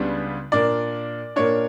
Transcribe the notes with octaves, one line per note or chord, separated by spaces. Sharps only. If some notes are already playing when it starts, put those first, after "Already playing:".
Already playing: C#2 C#3 G3 B3 D4
A#2 A#3 D4 D5
A#2 A#3 D4 C#5